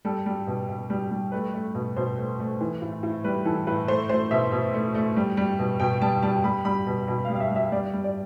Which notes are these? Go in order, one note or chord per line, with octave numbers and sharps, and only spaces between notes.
G3 A4
G3
B2
B2
G3
G3
A3 B4
A3
B2
B2 C5
A3
A3
E3
A2
A2
G3 B4
E3 A4
A2 B4
A3 C5
A3 C5
B2 E5
B2
A3
A3
G3
G3
B2
B2 G5
G3 A5
G3 A5
G3 B5
G3 B5
B2
B2
F5
G3
F5
E5
G3 E5
G3 D5
G3
D5